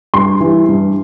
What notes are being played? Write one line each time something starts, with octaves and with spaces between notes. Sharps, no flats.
G2 C6
E3 G3
G2